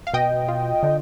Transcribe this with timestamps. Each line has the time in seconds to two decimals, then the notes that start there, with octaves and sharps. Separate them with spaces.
0.07 F5
0.13 B2 D#5 G5
0.48 F4
0.83 D3